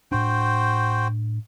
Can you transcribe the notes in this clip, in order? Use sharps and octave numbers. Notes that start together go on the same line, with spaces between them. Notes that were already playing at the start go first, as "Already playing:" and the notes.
A2 D4 F#4 C5 G5